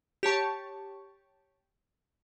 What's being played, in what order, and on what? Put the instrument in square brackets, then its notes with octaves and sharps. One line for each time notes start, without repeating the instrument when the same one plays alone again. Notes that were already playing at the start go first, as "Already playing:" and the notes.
[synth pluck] G4 C#5 A5 C#6